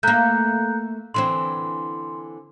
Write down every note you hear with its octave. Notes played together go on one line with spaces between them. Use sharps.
A3 A#3 A#5 F#6 G6
D3 E3 C4 C6